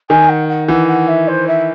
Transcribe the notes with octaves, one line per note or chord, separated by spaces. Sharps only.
D#3 G#5
F#5
F#5
E3 F#5
F#5
E5
C5
E5